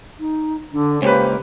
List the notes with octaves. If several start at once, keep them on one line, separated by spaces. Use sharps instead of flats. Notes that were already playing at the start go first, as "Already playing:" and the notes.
D#4
D3 D4
C#2 A#3 C#4 G4 B4 C5